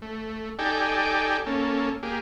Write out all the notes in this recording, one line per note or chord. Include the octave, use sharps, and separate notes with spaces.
A3
D#4 G4 A4 D5 G5 G#5
A#3 C#4 A4
A#3 G4 G#4